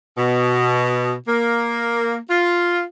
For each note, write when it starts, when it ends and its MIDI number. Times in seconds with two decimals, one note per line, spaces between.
0.17 1.14 47
1.27 2.15 58
2.29 2.82 65